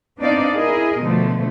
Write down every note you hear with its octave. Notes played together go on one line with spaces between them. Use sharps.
B3 C4 D4 D#4 D5 F5
E4 G#4 A#4 D#5
B2 D3 F3 A3